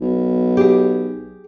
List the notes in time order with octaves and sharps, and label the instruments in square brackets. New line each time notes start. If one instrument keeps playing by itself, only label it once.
[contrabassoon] B1
[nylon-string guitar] G4 G#4